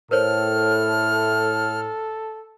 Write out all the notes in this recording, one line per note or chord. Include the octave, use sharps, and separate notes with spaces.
A2 A4 A#4 C5 C#5 F6